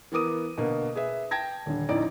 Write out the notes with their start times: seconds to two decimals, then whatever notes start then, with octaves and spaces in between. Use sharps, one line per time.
0.12 E3 B3 A#4 D6 D#6 D#7
0.58 B2 D3 A#3
0.95 G#4 B4 E5
1.31 G5 A5 G#6 A#6
1.66 D#1 D3
1.89 A1 E2 D3 D#4 D5